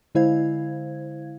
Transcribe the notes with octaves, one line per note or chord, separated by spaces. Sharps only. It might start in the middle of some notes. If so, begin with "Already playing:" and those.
D3 G#3 E4 C5 F5 G#6